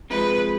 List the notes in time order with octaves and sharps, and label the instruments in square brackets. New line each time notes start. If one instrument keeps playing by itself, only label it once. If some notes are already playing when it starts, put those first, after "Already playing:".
[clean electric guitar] C3 F3 G#3 [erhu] B4